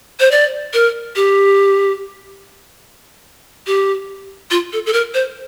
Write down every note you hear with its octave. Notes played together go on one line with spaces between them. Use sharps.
C5
D5
A#4
G4
G4
F4
A4
A4
A#4
C5